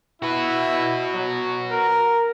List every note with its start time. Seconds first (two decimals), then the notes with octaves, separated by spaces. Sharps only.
0.22 E4 F#4 B4
1.13 F#3
1.71 A#4